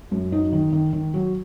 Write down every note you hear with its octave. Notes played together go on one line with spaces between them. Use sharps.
F#2
F#3 D#4
D#3
D#3
D#3
F#3